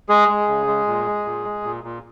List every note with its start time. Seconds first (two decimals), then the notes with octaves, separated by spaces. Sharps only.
0.09 G#3 G#4
0.28 G#3
0.48 C#3
0.67 G#3
0.87 A#2
1.06 G#3
1.25 A#2
1.44 G#3
1.64 A#2
1.83 A#2